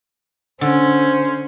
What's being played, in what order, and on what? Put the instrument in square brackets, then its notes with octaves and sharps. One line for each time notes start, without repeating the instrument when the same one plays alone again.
[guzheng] D3 [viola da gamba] C#4 [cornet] C5